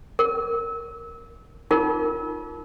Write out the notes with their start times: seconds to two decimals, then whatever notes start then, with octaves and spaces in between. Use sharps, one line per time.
0.19 A#4
1.71 D#4 F4 A#4